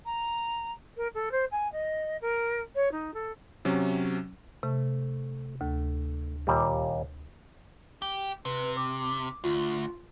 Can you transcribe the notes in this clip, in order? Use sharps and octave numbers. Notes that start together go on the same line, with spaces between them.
A#5
A#4
A4
C5
G#5
D#5
A#4
C#5
D#4
A4
C3 F#3 C#4
C3 A3
D2 A3
D#2 A#2 G3
G4
C3 B4
D6
D2 F4